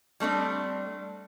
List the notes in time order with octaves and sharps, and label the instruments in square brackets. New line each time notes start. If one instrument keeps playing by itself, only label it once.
[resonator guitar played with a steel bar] G3 A3 C4 D4